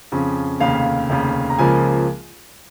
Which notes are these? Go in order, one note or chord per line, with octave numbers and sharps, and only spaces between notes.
F2 C#3 F3 C#4
F1 D#2 C#3 F5
F1 D#2 C#3
A#5
C#2 C#3 F3 A#3 G#5